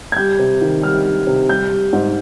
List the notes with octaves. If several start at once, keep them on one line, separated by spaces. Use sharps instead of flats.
G#6
G3 G6
C3
D#3
G3 F6
G3
C3
G3 G6
G3
G#2